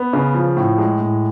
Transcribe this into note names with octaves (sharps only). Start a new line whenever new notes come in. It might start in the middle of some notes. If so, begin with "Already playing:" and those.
Already playing: B3
C#3
F3
A2
G#3
A2